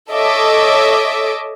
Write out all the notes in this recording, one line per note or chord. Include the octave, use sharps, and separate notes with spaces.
A4 C#5 D#5 E5 D6